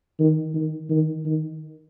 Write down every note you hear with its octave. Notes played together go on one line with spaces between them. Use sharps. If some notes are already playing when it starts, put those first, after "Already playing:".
D#3
D#3
D#3
D#3